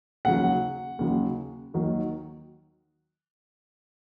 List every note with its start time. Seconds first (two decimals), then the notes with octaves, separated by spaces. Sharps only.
0.25 D#2 C#3 F#3 F#5
0.99 D#2 C#3 F#3
1.74 D#2 D#3 F#3